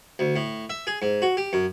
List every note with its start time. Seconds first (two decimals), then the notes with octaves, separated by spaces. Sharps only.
0.19 D2
0.36 A2
0.70 E5
0.87 G#4
1.02 G#2
1.22 F#4
1.37 G4
1.53 F#2